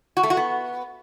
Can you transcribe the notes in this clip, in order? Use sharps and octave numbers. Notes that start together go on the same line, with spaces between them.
F#4
A3
F#4
B3